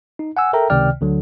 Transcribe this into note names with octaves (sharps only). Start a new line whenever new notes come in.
D#4
F#5 G#5 E6
A4 A#4 E5 G5 A#5
C#2 C3 D#3 D5 G5 F6
D2 D3 F#3